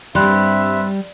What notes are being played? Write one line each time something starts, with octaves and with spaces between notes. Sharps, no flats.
G2 G3 C4 E5 B5 C6 F#6